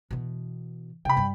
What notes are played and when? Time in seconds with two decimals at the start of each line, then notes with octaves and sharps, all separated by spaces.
0.11 B2 E3
1.05 C3 G5 B5
1.17 G2 G3